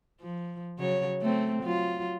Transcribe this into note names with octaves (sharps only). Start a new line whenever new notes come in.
F3
C#3 F#3 C#5
A3 C4
F#3 F4